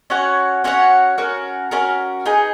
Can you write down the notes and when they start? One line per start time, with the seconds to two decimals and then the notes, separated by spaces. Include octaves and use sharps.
0.10 C#4 F#4 C#5 F#5
0.64 C#4 F#4 C#5 F#5
1.18 C#4 F#4 A#4
1.71 C#4 F#4 A#4
2.26 D#4 G#4 B4